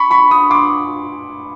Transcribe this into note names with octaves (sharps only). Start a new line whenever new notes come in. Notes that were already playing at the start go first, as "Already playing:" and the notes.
Already playing: B5 C#6
B5 C#6
C#6 D#6
C6 D6